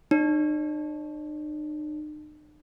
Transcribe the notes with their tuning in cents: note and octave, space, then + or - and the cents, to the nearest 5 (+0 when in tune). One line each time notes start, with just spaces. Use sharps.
D#4 -45 C#5 +0